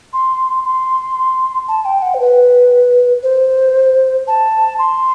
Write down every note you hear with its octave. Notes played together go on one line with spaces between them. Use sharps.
C6
C6
A5
G5
F#5
C5
B4
C5
A5
C6